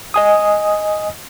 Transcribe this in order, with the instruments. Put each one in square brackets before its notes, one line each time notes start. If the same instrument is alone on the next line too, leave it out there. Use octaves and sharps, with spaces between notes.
[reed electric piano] D#5 G#5 D#6